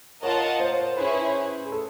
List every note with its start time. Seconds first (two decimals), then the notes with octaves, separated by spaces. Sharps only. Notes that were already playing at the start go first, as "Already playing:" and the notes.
0.22 F4 A#4 C#5 D#5 F#5 A5
0.60 C5
0.97 C#4 E4 G#4 B4 C#5
1.66 G#4
1.72 A4